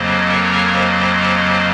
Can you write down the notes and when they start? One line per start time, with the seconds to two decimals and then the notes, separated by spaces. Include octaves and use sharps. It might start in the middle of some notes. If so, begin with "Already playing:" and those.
Already playing: F2 C#3 F#3 A#3 C5 D#5
0.29 A#4 C#5
0.73 C5 D#5